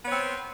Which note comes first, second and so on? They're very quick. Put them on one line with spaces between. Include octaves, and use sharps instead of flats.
B3 C#5 C4